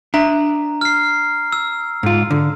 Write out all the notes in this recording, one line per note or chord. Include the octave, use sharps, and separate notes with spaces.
D4 E5 A#5
F6 C7
E6
G#2 F4
D3